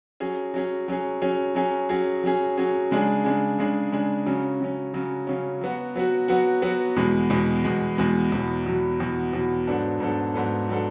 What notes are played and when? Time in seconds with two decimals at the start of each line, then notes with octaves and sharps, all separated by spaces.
0.20 F#3 C#4 G#4
0.54 F#3 C#4 G#4
0.88 F#3 C#4 G#4
1.22 F#3 C#4 G#4
1.55 F#3 C#4 G#4
1.89 F#3 C#4 G#4
2.24 F#3 C#4 G#4
2.57 F#3 C#4 G#4
2.91 C#3 G#3 D4 G#4
3.24 C#3 G#3 D4 G#4
3.59 C#3 G#3 D4 G#4
3.92 C#3 G#3 D4 G#4
4.26 C#3 F#3 C#4
4.60 C#3 F#3 C#4
4.94 C#3 F#3 C#4
5.27 C#3 F#3 C#4
5.61 F#3 B3 F#4
5.95 F#3 B3 F#4
6.28 F#3 B3 F#4
6.62 F#3 B3 F#4
6.96 E2 B2 G#3
7.30 E2 B2 G#3
7.64 E2 B2 G#3
7.98 E2 B2 G#3
8.32 E2 B2 F#3
8.66 E2 B2 F#3
9.00 E2 B2 F#3
9.33 E2 B2 F#3
9.67 G#2 F#3 B3 D4 A4
10.00 G#2 F#3 B3 D4 A4
10.34 G#2 F#3 B3 D4 A4
10.69 F#3 B3 D4 A4